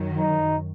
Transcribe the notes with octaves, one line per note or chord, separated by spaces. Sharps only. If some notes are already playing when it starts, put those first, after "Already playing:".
Already playing: F#2 D#3 F#3
D#4